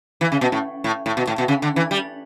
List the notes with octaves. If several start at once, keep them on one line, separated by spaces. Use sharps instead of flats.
E3
C#3
B2
A2
A2
A2
B2
A2
B2
C#3
D3
E3
G3